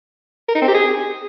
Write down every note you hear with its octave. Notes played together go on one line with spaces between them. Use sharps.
A#4
D#4
C4
G4
G#4